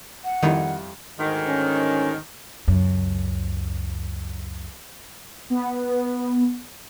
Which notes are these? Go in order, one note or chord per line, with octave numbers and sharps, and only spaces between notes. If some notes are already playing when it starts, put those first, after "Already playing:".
F#5
F2 D#3 G3 E4
D2 G#2 D#3
C#4
C#2 F#2
B3